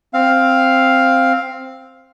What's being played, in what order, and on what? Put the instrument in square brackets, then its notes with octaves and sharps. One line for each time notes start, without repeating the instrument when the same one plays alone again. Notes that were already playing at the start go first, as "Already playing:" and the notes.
[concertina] C4 F5